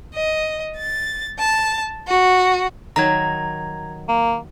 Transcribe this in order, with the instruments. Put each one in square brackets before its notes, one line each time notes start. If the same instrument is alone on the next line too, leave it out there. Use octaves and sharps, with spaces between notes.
[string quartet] D#5
A6
A5
F#4
[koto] D#3 F#3 [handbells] A#5 G#6
[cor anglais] A#3